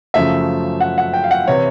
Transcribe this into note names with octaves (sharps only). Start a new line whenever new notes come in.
F#2 C#3 F3 A3 E5
F#5
F#5
G5
F5
F#5
C3 E3 C#5